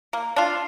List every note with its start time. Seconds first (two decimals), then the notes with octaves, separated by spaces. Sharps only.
0.13 A#3
0.36 D4 F4